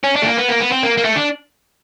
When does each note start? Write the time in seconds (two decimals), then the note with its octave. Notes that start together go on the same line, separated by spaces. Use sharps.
0.03 C#4
0.16 D4
0.22 A3
0.26 A#3
0.37 B3
0.49 A#3
0.60 B3
0.71 C4
0.82 A#3
0.97 A#3
1.04 A3
1.16 D4